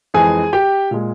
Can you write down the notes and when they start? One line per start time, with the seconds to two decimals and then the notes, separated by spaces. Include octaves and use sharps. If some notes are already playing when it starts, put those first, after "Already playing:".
0.14 F2 E3 G#3 G#4 G#5
0.53 G4 G5
0.91 A#2 G#3